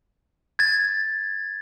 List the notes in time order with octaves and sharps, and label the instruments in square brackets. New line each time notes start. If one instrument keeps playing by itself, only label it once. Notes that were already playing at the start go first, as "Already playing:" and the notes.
[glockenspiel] G#6 A6